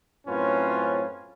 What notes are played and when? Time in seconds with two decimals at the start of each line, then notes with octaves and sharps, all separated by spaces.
0.27 F#2 A2 C4 C#4 F4 B4